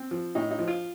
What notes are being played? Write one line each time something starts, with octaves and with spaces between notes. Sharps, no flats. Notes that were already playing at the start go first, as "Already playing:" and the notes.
Already playing: C4
F3
A2 D#4
D#4
F3
F4